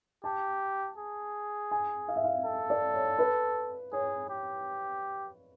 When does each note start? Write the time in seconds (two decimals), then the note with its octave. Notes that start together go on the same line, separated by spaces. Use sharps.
0.24 G4 A5
0.98 G#4
1.71 G#5
2.08 F5
2.16 E5
2.24 F5
2.45 A4
2.70 D5
2.94 C#5
3.19 B4
3.92 G#4 C#5
4.29 G4